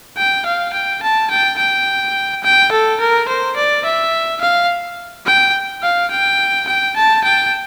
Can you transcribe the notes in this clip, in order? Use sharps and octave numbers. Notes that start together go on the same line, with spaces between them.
G5
F5
G5
A5
G5
G5
G5
A4
A#4
C5
D5
E5
F5
G5
F5
G5
G5
A5
G5